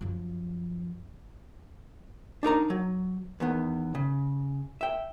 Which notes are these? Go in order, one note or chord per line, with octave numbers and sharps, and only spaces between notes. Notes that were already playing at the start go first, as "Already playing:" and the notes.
F#2 F3
D4 D#4 A#4 A#5
F#3
E2 D#3 B3
C#3
E5 G5